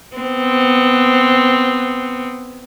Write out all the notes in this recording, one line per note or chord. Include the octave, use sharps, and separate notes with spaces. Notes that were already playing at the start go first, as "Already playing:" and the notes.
B3 C4